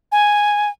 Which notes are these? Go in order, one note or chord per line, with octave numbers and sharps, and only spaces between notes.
G#5